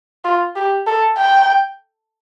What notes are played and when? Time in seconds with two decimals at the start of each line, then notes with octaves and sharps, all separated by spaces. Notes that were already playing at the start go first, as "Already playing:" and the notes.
0.24 F4
0.56 G4
0.86 A4
1.17 G5